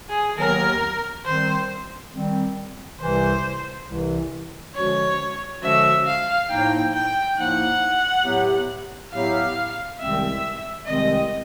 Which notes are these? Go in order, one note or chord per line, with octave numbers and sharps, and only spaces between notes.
G#4
D#2 D#3 F#3 B3 A#4
D#3 G3 C4 C5
D#3 G3 C4
C2 C3 E3 C5
C2 C3 E3
D3 F3 G#3 C#4 F#4 C#5
D3 F3 G#3 C#4 F#4 E5
F5
A2 F3 A#3 D#4 G5
G5
A2 F3 A#3 D#4 F#5
A2 F#3 B3 E4 G4
A2 F#3 B3 E4 G4 F5
C2 C3 D#3 G#3 C4 E5
C2 C3 D#3 G#3 C4 D#5